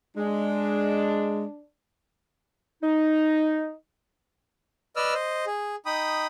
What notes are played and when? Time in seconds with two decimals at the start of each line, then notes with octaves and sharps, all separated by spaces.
0.17 G#3 D4
2.82 D#4
4.96 B4 D5 D#5 E6 F6
5.14 C5 D#5
5.47 G#4
5.86 D#4 G5 B5 D#6